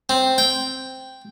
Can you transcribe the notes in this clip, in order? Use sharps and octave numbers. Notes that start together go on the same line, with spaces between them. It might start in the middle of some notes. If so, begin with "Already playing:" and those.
C4
G5